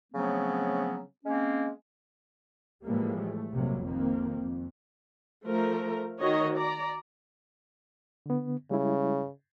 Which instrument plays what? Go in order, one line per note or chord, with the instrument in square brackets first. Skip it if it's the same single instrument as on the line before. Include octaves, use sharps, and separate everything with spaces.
[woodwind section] C#3 F3 F#3 A3 B3 C4
G#3 A#3 C4 C#4
[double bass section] A2 E3 F3 G3 G#3 A#3
A3
F1 A#1 C3 F#3 G3 A#3
F2 D#3 A#3 C4
F2
[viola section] F3 A3 A#4
D#3 F#4 C#5 D#5
D5 A#5
[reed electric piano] D3 B3
[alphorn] C#3 [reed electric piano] G3 G#3 E4